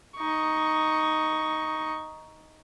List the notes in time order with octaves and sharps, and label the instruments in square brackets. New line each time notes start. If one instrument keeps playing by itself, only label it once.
[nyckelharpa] D#4 C#6